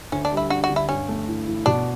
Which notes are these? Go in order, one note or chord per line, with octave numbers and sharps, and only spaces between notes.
D2 C#4
D4
G3
E4
D4 F#4
F#4
D3
E4
G2 C#4
A3
E4
E3
B2 D4